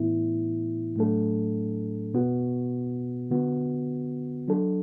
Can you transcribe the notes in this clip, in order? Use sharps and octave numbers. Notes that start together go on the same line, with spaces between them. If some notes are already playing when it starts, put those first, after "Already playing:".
Already playing: A2 E3 B3 E4
A2 F#3 A3 D4 A4
B2 B3 F#4
D3 B3 F#4
F#3 D4 A4